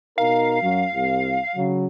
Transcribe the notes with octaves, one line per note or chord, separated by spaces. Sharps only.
B2 D#4 A#4 F5
F#2 F#3
C2
C#3 F#3